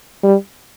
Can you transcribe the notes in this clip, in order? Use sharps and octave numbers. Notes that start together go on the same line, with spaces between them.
G3